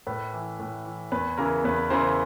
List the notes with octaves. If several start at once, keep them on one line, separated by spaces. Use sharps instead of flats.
A2 B4
E3
A2
E3
E2 B4
C#3 E3 A#4
E2 B4
C#3 E3 A#4 C5